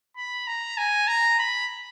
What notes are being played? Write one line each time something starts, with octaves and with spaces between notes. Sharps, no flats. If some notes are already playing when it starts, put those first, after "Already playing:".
B5
A#5
G#5
A#5
B5